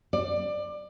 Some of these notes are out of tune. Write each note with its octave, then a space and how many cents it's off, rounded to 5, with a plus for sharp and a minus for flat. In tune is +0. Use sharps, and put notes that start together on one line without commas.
D5 +25